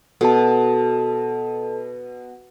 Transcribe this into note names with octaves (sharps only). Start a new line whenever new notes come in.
B2 A4 A5